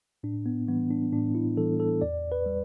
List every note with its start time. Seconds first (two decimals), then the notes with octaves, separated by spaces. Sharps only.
0.23 A2 D4
0.46 B3
0.68 E3 G3 B3
0.91 D4
1.13 A2 D4
1.35 E4
1.57 E3 G3 A4
1.80 A4
2.02 E2 D5
2.32 B4
2.46 G3